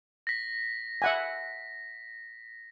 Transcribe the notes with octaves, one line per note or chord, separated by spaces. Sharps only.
A#6 B6
E5 F#5 G#5